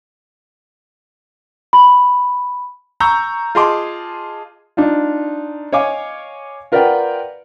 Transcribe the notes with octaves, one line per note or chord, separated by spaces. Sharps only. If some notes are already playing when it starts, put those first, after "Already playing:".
B5
A#5 C#6 E6 G6
F4 G#4 D#5 A5 C6 D6
D4 D#4 F4
C#5 D#5 F5 G#5 D6
F4 A#4 B4 D5 F#5 G5